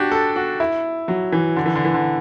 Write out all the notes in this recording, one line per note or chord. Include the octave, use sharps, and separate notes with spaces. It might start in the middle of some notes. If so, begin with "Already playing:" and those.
Already playing: D4 F#4 G4
A4
F#4
E4
F#3
E3
D3
E3
D3
E3
D3